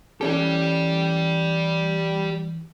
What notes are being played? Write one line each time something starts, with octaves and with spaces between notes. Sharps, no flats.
E3 C#4 G4 A4 D5